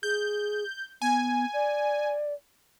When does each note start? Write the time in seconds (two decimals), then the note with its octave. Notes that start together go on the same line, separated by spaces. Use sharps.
0.03 G#4 G6
1.02 B3 G#5
1.54 D5